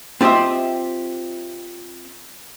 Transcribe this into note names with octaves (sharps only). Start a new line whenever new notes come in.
C4 F4 G4 D#5 E5